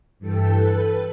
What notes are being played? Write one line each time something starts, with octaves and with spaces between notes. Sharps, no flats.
G2 E3 A4 G5
A4 B4